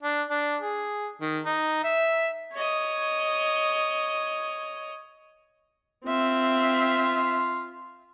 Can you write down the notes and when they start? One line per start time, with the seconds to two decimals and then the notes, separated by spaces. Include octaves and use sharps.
0.03 D4
0.30 D4
0.62 G#4
1.21 D#3
1.46 D#4
1.84 E5
2.53 C#5 D#5
6.06 C4 F4 E5